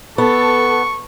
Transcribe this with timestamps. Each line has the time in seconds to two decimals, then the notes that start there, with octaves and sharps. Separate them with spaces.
0.18 B3 A4 C#6